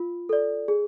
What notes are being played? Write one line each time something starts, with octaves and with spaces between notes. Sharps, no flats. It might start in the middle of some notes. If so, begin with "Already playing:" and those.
Already playing: F4
A4 D5
G#4